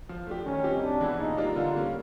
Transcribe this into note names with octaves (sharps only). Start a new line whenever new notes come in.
F3
A3 D4 G4
D#3 C#4
G3 C4 D#4 G4
C3 D4
E3 G#3 B3 E4
A#2 D#4
G3 A#3 D4 F4
D3 F4
G3 A#3 C#4